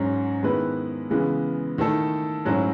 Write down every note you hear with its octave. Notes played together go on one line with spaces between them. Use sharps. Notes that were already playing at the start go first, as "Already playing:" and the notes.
Already playing: G#2 F#3 C#4
D#3 G#3 B3 E4 B4
C#3 E3 G#3 B3
D#3 A3 E4 A4
G#2 F#3 A3 C#4 E4